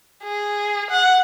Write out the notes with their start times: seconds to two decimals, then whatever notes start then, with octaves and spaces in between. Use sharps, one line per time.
0.23 G#4
0.91 F#5